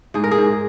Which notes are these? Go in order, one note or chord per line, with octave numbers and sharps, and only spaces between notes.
G#2 G#4
A#4
G#4
G#2